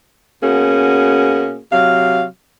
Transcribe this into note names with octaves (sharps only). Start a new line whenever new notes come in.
B2 A#3 C#4 F#4 G#4
C3 F#3 F5